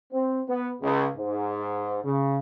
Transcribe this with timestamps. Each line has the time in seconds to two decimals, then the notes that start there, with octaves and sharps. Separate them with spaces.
0.13 C4
0.48 B3
0.82 C#2
1.17 G#2
2.04 C#3